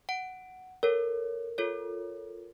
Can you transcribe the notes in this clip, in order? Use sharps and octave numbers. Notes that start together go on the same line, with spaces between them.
F#5 D7
A4 A#4 C#5
F4 A4 C#5